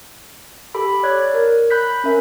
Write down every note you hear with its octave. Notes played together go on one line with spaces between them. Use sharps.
G4 A4 B5
C#5 D5 F#6 G#6
A#4
B5 F#6 G6 B6
C#4 A#4 E5